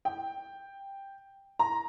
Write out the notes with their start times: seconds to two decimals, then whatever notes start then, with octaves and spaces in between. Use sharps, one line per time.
0.05 G5
1.59 A#5